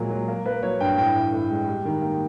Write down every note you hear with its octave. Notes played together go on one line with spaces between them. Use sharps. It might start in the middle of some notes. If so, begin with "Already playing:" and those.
Already playing: A#2 F#3 G#3 A#3
F#3
A#3
A#3 B4
F#3 C#5
G2 G5
A2 G5
E3
A2
G#3
G3
D#3
A#3